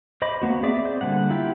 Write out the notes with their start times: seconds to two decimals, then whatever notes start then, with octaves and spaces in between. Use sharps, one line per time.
0.22 C5 D#5 B5 D6
0.42 A#3 B3 F#4
0.63 C4 G#4 D5 E5 D6
0.85 C5
1.01 D3 G3 A#3 F#5
1.30 E4 F4 G4